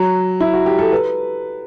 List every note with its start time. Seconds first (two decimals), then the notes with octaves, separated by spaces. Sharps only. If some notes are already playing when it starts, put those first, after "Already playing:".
Already playing: F#3
0.40 E4
0.54 F#4
0.66 G4
0.78 A4
0.92 B4